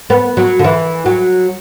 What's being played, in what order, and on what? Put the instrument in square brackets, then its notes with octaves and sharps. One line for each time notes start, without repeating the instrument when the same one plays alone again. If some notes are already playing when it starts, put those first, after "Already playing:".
[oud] B3
F#3
D3
E3
F#3